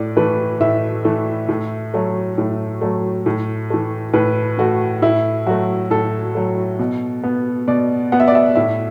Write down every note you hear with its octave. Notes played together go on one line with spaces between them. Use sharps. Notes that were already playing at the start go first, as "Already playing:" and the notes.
Already playing: A2 D5
E3 A3 B4
A2 E5
E3 A3
A2
F#3 A3
A2
F#3 A3
A2
E3 A3
A2 B4
E3 A3 F#4
A2 E4
F#3 A3 F#4
A2 A4
F#3 A3
B2
B3
B2 D5
B3 F#5
E5
D5
E5
A2 E5